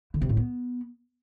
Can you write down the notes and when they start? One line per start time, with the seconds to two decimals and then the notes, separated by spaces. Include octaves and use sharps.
0.14 D3
0.22 C3
0.29 A2
0.37 B3